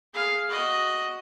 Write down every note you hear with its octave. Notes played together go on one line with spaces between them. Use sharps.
G#4 F5
F#4 D#5